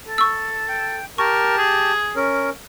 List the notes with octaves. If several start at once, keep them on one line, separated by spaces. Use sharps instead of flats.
A4
C#6 E6
G5
G4 A#4 A5 C#6
G#4
C#4 A#4